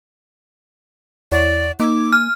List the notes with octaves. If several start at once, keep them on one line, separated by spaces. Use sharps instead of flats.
E2 E4 C#5 D5 F#5
A#3 D#4 D6 E6 G#6
G#5 F6